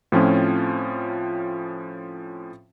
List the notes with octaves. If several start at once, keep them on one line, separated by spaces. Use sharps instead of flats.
A2 F3 C4 C#4 F4